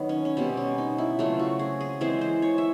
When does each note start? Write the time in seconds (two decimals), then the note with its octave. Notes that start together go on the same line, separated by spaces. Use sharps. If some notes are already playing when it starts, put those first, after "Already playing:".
Already playing: D#3 F#3 B3
0.09 C#4
0.25 C#4
0.37 B2 G3 B3 C4
0.57 C#4
0.78 D#4
0.98 E4
1.19 C#3 F#3 A3 C4 F4
1.39 F#4
1.59 G#4
1.81 G#4
2.01 E3 G#3 C4 C5
2.21 C5
2.42 C#5
2.58 E5